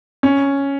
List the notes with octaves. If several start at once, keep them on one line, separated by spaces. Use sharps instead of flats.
C#4